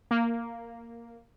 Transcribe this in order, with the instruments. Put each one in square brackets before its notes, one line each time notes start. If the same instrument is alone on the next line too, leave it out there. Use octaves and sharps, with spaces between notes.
[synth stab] A#3